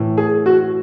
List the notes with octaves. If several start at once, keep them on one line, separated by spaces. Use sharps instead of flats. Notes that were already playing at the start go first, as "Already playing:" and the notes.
Already playing: A2 E3
G#4
F#4